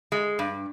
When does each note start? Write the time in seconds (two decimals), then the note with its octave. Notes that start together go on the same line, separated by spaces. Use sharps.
0.12 G#3
0.39 G2